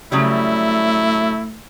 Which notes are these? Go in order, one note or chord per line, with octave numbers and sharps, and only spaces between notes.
C#3 F#3 G3 A3 E4